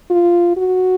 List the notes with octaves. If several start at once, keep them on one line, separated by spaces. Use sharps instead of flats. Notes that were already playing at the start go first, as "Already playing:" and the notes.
F4
F#4